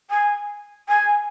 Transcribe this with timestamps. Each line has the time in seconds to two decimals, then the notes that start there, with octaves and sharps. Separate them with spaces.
0.10 G#5
0.88 G#5